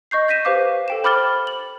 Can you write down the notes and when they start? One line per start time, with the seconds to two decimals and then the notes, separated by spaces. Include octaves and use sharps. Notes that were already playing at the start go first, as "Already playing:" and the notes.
0.11 D#5 C#6 G6 C7
0.28 G6 A#6 B6 D#7 E7
0.45 G4 B4 C5 F5 D6
0.88 A4 G5 E7
1.04 C5 B5 D6 F6 A6 G7
1.47 F#7